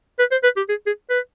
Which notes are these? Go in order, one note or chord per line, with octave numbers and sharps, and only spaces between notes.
B4
C5
B4
G4
G#4
G#4
B4